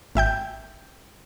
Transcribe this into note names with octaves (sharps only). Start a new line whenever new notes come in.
G#1 E5 G5 G6